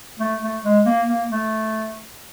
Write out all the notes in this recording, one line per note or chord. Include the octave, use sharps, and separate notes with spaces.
A3
A3
G#3
A#3
A#3
A3